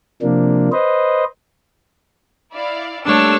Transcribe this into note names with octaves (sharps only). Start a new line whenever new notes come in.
C3 F3 A#3 D4
B4 C5 D#5
E4 D5 F5
G3 A3 A#3 D4 C#5 A5 E6